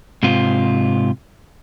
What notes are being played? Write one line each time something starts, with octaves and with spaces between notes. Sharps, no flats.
G#2 C3 F4